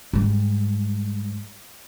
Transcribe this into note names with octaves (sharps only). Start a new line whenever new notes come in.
G#2 G3